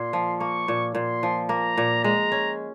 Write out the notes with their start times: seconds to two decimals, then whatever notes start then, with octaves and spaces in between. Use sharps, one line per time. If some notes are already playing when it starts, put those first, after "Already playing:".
Already playing: A#2 C6
0.13 F3
0.40 A#3 C#6
0.68 A#2
0.95 A#2 C6
1.23 F3
1.49 A#3 A#5
1.77 A#2
2.04 G#3 A#5
2.32 C#4